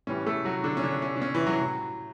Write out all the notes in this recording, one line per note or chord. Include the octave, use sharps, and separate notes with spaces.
A2 E3 G3 C#4
A3 A4
F#3 F#4
D3 D4
C#4
D3 D4
C#4
D4
C#4
E3 E4
F#3 F#4
A2 F#3